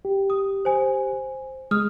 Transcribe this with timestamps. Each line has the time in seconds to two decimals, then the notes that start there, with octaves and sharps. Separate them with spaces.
0.05 G4
0.30 D#6
0.65 C5 G#5
1.71 G#3 D#6 F6